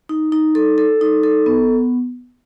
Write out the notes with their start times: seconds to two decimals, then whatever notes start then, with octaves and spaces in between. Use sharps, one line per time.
0.09 D#4
0.32 D#4
0.55 A4
0.78 A4
1.01 D#4
1.23 A4
1.46 B3